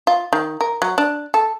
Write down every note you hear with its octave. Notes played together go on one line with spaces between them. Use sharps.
F4
D#3
A#4
F#3
D4
A4